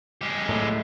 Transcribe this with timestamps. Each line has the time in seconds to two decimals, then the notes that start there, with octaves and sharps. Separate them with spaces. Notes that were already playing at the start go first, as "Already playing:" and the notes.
0.21 G#3 G4
0.49 A2